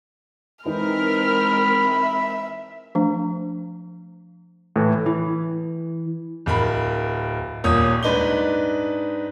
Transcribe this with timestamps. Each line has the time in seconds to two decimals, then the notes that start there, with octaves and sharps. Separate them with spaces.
0.66 E3 G#3 C4 D#4 A#4 B5 F6
1.88 E5
2.95 F3 A3 D4
4.76 A2 E3
5.06 E3
6.46 D1 A#4 B5
7.64 D#1 A#2 C#5 D#6
8.03 G#2 D4 B4 D#5 G7